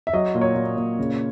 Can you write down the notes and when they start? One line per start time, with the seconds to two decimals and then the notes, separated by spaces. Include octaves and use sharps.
0.07 E5
0.13 F#3 D#5
0.35 A#2
0.41 C#5
0.55 A#2
0.77 A#2
0.99 C#3